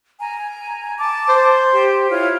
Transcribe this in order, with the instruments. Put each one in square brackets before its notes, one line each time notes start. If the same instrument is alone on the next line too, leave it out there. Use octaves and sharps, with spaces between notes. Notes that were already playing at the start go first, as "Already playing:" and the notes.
[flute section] G#5 A#5
A5 D6
[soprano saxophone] C5
[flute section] G4
E4 F4 C#5